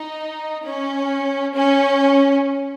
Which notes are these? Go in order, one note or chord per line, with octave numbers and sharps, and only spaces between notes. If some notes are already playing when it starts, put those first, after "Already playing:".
Already playing: D#4
C#4
C#4